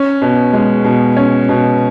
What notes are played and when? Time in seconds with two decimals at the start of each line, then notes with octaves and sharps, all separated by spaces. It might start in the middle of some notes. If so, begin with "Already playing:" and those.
Already playing: C#4
0.22 B2
0.53 G#3
0.84 B2
1.17 C#4
1.49 B2